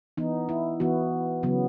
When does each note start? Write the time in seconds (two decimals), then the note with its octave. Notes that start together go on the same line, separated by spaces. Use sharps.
0.17 E3 B3 D#4
0.49 E4
0.80 E3 B3 F#4
1.43 C#3 F#3 B3